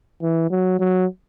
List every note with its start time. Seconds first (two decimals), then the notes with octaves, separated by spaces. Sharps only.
0.22 E3
0.51 F#3
0.80 F#3